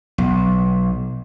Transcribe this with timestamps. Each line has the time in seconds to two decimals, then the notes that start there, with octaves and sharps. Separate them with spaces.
0.18 B1